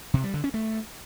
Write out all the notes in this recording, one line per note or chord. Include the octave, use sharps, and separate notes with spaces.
C3
G3
D3
C#4
A3